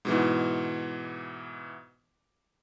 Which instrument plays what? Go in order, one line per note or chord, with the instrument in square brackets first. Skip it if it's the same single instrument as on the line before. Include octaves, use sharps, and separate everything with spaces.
[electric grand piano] G#2 B2 E3